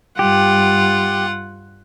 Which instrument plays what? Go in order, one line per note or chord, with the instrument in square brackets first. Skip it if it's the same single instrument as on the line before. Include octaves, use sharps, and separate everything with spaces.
[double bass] G2 G3 [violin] F4 [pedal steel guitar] G4 [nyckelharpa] F#5